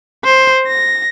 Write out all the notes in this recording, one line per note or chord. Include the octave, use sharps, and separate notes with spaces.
C5
A#6